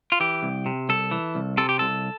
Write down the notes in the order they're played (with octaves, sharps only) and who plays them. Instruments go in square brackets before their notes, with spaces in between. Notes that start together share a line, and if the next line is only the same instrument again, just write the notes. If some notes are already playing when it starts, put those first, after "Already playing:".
[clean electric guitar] F4
E3 G4
C2
C3
C2 A4
E3
C2
C3 A4
G4
C2 A4